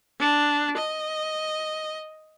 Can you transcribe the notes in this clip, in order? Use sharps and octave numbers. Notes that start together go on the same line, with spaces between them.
D4
D#5